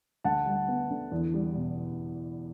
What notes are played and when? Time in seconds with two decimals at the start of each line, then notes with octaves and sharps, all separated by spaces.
0.24 D2 F#5 A5
0.46 G3
0.68 B3
0.90 D3
1.12 E2
1.34 G3
1.55 B2